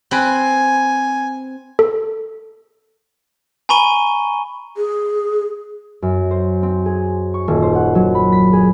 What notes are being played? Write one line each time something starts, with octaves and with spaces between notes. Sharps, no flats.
C4 B4 G#5
A4
G#5 A#5 B5 C#6 D#7 G7
G#4
F#2
C5
C4
G#4
C#6
D#1
C5
F#5
F#3
B5
B6
G#4